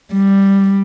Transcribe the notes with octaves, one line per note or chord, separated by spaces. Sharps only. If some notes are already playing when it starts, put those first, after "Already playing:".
G3